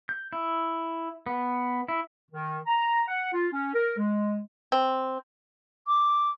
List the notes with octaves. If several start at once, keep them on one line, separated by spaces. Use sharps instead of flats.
G6
E4
B3
E4
D#3
A#5
F#5
F4
C#4
A#4
G#3
C4
D6